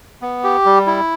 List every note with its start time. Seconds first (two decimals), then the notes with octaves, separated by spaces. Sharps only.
0.22 B3
0.44 G4
0.66 G3
0.87 E4